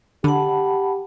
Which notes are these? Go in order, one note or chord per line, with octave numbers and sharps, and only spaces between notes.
D3 G4 F#5 A5 B5